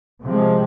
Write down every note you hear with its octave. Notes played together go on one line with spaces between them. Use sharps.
C3 F3 G#3